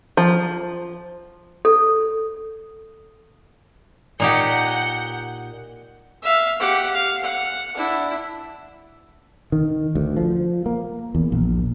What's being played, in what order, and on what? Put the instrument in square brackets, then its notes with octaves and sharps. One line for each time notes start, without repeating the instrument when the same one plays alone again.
[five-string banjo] F3
[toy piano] A4
[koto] A#2 D#4 G4 [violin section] F#5 G6 C#7
[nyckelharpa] E5 F5
G4 F#5
F5
F#5
D4 E4
[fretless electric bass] D#3
D2
F3
A#3
E2
A#1